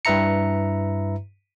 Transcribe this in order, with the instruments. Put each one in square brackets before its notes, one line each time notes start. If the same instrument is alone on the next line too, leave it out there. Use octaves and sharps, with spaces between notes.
[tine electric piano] G2 E4 B4 E5 A#5 C#7